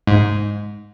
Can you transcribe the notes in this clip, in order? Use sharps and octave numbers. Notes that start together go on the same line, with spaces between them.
G#2